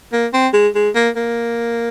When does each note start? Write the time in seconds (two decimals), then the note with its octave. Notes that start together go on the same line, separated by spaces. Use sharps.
0.12 A#3
0.33 C4
0.53 G#3
0.75 G#3
0.95 A#3
1.16 A#3